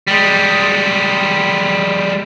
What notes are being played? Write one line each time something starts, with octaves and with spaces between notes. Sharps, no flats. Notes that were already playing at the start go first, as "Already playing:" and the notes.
G3 G#3